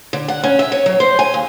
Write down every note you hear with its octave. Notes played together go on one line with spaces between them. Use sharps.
D3
F#5
C#4
E5
C#5
F#3
C5
G#5
D#2